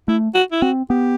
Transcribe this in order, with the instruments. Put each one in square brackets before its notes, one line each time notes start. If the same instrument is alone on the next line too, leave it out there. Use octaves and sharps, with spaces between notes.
[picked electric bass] A3 [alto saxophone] E4
[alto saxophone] F#4
E4
[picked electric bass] C4 [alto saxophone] F#4
[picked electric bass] B3 [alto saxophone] G4